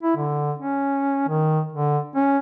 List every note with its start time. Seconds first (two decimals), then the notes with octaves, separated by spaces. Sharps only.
0.03 E4
0.17 D3
0.59 C#4
1.28 D#3
1.73 D3
2.15 C#4